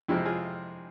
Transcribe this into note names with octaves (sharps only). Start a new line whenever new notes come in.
F2 C3 F3 G#3 C4 E4
F4 G#4